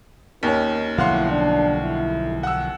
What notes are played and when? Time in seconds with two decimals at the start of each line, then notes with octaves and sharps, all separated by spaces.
0.43 D#2 D#3 C#4
0.98 B1 D3 F3 E4 F5 F#5 C6
1.31 D4
1.83 E4
2.43 F#5 E6